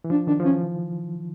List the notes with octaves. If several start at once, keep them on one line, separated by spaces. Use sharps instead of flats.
E3
F3 D4
D#3 D4
F3
E3 C#4